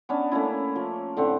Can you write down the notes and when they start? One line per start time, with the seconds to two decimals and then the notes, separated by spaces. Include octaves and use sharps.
0.09 B3 C#4 D4
0.32 A3 A#3 C#4 E4
0.76 F3
1.17 A2 D3 C4 F#5